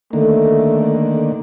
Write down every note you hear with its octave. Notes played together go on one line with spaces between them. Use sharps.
D3 D#3 A3 A#3